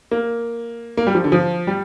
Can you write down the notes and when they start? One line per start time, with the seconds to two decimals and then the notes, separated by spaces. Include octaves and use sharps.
0.11 A#3
0.97 A#3
1.07 G3
1.15 F3
1.24 D3
1.32 F3
1.67 G3